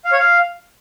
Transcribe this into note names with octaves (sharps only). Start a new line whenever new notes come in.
F5
C#5
F5